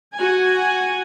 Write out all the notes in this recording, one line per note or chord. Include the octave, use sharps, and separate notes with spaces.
F#4 G#5